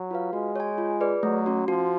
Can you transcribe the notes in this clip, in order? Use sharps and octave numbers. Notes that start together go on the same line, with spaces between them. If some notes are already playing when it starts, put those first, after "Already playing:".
Already playing: F#3
F4 B4 F5
G#3 F#4
C#5 G#5
F4
G#4 B4 D5
F#3 A3
C#4 F#4
F3 F#4